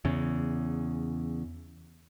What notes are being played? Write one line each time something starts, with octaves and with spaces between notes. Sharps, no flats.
E2 C#3